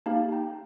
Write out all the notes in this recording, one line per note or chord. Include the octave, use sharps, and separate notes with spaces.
A#3 D#4 G4 F5 A5
G5 A#5